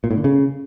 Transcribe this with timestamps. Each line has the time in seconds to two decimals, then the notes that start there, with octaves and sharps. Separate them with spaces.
0.04 A#2
0.11 A2
0.17 D3
0.24 C#3